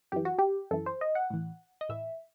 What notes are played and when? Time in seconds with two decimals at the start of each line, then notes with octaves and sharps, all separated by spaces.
0.12 F#2 E3 G4
0.25 F#4
0.39 G4
0.71 F#2 E3 A4
0.86 C5
1.01 D#5
1.15 F#5
1.30 A2 E3
1.81 D#5
1.89 A2 E3 E5